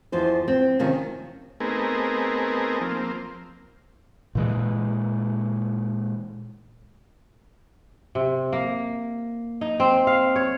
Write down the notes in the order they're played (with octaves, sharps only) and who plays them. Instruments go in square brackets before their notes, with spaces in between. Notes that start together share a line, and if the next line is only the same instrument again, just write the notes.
[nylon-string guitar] E2 F3 C5
C4
C3 D#3 F3 C#4
[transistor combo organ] A3 B3 C4 D#4 G#4 A#4
F3 A#3 C4
[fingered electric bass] A#2 E3 G#3
[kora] C3
A#3
D#4
C4
F5
C#5